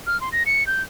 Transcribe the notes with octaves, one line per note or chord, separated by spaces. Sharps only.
F6
C6
A#6
C#7
G6